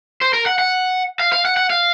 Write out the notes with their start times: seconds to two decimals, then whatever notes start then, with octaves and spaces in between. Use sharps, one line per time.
0.21 C5
0.33 A#4
0.46 F#5
0.59 F#5
1.19 F5
1.33 F5
1.45 F#5
1.57 F#5
1.70 F5